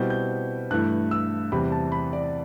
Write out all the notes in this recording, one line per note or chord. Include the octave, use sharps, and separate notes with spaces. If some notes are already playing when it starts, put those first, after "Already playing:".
Already playing: B2 G3 C4 E4 G6
G6
G2 E3 A3 E4 F#6
E6
E2 C3 G3 B5
A5
B5
D5